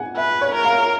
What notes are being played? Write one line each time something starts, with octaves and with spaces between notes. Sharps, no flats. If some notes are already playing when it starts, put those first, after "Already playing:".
Already playing: F#5 G#5
B4 E5
C#5
A#4
F5